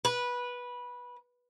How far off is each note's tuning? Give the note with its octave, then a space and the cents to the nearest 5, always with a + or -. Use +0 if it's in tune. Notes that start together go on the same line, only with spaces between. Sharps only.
B4 -15